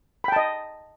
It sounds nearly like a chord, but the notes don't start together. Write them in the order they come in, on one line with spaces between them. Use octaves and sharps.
B5 G5 A5 D#5